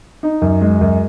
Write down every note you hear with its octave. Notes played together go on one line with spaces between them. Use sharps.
D#4
F#2
G#3
F#2